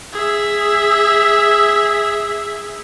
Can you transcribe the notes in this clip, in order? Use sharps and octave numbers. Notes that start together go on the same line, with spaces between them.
G#4 E5